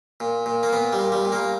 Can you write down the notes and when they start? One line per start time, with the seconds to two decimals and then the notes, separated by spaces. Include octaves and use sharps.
0.20 A#2
0.46 A#2
0.63 A#3
0.73 A#2 B3
0.93 G3
0.99 A#2
1.12 G3
1.25 A#2
1.32 A#3